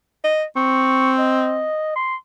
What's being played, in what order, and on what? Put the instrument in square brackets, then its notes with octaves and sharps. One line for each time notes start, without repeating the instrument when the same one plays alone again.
[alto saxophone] D#5
[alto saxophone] C4 [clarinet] C#6
[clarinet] D#5
C6